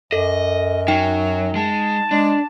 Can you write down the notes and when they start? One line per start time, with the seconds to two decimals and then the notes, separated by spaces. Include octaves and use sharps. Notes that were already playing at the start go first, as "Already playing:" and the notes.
0.12 F#2 A4 D#5
0.88 F#3 D#4 G5
1.56 G#3 A5
2.11 G#3 D4